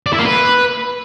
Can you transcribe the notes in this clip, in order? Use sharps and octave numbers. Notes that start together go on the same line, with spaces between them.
D5
E4
A#3
B4